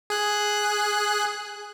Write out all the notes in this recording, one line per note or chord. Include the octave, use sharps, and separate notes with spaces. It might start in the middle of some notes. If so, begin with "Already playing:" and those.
G#4 F#6